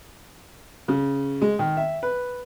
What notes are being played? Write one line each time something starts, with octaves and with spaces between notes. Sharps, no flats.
C#3
G#3
D#3
E5
B4